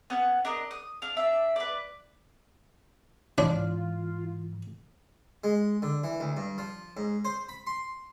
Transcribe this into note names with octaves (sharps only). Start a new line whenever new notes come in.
B3 C#4 F#5
D4 A#4 D#5
D#6
D4 F5
D4 E5
B4 D5
G#2 E3 D4 F4
G#3
D3
E3
D2
G2
F3
G#2
C5
B5
C6